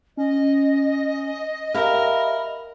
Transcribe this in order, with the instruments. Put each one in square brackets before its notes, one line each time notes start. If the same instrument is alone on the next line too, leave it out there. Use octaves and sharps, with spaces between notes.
[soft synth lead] C#4 [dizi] D#5
[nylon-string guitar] G4 E5 F5 [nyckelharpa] A#4 [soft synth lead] B5